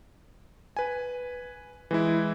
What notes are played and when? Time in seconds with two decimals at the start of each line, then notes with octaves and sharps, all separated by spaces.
0.77 B4 G#5
1.91 E3 G#3 E4